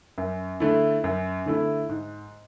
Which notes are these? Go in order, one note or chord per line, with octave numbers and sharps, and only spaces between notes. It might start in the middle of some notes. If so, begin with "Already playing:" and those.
F#2
D3 A3 E4
F#2
D3 A3 E4
G#2